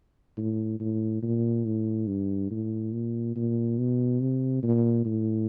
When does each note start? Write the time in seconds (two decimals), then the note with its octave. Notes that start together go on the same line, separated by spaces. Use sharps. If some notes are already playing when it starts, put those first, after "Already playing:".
0.38 A2
0.80 A2
1.22 A#2
1.65 A2
2.07 G2
2.51 A2
2.93 A#2
3.36 A#2
3.78 B2
4.21 C3
4.63 A#2
5.05 A2